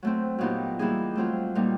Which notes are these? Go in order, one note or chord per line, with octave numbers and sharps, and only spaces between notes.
F#3 A3 C4
A#2 F#3 B3 D#4 G4
E3 G3 A#3 D#4 G#4
F#3 A3 C4 F4
A#2 G3 A#3 D#4